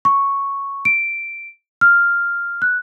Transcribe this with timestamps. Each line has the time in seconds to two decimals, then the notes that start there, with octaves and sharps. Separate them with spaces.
0.05 C#6
0.85 D7
1.81 F6
2.62 F#6